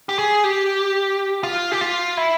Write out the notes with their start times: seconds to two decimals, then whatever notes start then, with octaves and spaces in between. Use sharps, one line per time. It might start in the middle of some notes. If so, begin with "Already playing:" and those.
0.09 G4
0.19 G#4
0.44 G4
1.43 F4
1.72 G4
1.81 F4
2.17 E4